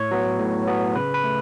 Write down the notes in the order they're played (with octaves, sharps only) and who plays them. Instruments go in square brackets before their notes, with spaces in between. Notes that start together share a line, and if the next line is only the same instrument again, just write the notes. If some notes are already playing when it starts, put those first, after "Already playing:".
Already playing: [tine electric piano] A2 C#5
F#3 B3
A2
F#3 B3
C#3 B4
B4
A3